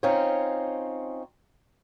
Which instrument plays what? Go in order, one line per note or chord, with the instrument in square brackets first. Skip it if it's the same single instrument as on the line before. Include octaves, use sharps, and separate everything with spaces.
[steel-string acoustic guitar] C4 C#4 D#4 F4 C#5